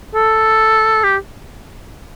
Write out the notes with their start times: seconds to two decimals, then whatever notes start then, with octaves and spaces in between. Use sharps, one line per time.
0.14 A4
1.03 G4